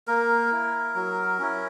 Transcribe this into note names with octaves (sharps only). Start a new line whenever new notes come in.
A#3 A#4
E4
F#3
C#4 E4